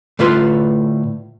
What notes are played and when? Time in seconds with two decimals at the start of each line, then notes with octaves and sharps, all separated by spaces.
0.19 A2 D3 A3 F4 B4 C6